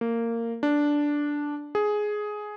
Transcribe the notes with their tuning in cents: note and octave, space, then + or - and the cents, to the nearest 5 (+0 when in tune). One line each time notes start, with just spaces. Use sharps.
A#3 -15
D4 -5
G#4 +10